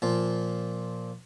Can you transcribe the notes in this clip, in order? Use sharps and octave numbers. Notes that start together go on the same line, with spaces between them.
A#2 F3